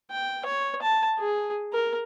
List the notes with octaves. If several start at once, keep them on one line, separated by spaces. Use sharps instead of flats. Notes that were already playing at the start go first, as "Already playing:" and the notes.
G5
C#5
A5
G#4
A#4